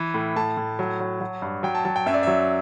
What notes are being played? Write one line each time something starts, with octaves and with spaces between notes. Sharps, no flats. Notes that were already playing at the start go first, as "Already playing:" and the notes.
Already playing: E3
A2
A2 A5
A2
F#3
F#3
F#3
G2
F#3 G5
A5
F#3 A5
G5
F#2 E5
D5
F#3 E5